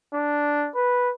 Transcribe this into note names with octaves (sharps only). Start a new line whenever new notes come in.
D4
B4